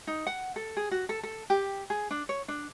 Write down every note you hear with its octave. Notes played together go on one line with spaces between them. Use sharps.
D#4
F#5
A4
G#4
F#4
A4
A4
G4
G#4
D4
C#5
D4